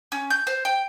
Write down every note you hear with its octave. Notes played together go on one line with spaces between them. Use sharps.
C#4
G6
C5
G5